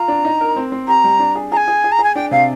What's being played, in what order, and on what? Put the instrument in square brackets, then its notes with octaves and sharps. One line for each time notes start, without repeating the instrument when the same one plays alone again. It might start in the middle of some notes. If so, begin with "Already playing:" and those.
Already playing: [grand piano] F4 [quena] A#5
[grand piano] D4
D#4
A#4
C4
C4
[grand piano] G4 [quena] A#5
[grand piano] G3
D4
G#4
[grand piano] G#4 [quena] G#5 A#5
[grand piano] G#4
G#4
[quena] A#5
[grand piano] G#4
[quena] G#5
[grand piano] D4 [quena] G5
[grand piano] C3 [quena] F5